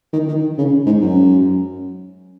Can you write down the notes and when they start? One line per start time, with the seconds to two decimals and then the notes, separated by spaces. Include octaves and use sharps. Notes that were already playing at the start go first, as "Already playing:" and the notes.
0.13 D#3
0.28 D#3
0.58 C#3
0.86 G#2
1.02 F#2